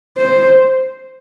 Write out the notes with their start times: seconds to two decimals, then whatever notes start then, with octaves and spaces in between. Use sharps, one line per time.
0.18 C5